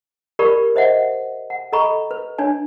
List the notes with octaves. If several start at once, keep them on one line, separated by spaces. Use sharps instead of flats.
G4 A#4 D5 B5 C#6
C5 D#5 E5 F#5
F#5
A4 D#5 A#5 B5 C#6
B4
D4 C#5 G#5